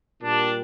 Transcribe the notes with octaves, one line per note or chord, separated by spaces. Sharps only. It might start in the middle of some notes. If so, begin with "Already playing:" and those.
A#2 G3 A#3 D4